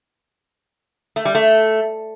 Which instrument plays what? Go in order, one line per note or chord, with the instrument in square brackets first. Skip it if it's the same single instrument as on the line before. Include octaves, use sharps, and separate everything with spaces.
[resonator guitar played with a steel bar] A3
G3
A3